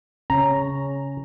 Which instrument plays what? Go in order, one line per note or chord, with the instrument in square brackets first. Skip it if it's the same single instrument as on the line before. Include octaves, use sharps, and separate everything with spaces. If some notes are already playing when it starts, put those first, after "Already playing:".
[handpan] C#3 C#4 [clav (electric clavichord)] A#5